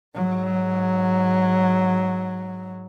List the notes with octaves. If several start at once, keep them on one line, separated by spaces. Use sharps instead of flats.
G#2 F#3